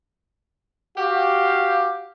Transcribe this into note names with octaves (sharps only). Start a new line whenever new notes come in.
F#4 G4 F5